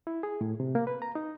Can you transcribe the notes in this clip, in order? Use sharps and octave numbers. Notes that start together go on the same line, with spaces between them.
E4
G#4
A2
C3
A#3
B4
A#5
D#4